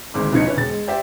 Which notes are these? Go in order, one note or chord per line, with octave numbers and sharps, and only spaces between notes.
G#1 D2 G#2 D6
F1 B1 C4 D#4 G#6 C#7
C#4 D4 E4 B4 C#5
E1 A6
G#3
G4 C5 D5 E5 G5